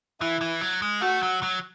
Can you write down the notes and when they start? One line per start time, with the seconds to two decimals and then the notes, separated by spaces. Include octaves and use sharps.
0.21 E3 E4
0.41 E3
0.61 F#3
0.82 G#3
1.01 A3 F#4
1.23 F#3
1.43 F#3